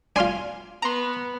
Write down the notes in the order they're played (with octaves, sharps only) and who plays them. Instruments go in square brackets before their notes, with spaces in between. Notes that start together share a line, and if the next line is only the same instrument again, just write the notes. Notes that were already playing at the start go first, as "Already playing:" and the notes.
[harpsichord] D4 F4 [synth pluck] G#5 C6 F6
[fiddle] B3 [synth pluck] A#5 C6